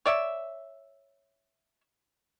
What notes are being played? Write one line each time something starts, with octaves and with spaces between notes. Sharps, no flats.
C#5 D5 E5